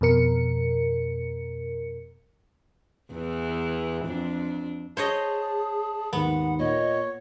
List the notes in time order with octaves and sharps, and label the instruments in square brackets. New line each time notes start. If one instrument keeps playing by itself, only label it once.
[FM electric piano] F2 B2 A#4 C#7
[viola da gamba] E2 E3
F2 D4
[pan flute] G#4 [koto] C5 C#5 D#5 [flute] A5
[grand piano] D#2 G#2 [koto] B3 [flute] F#5
[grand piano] A#2 [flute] C#5 [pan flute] D#5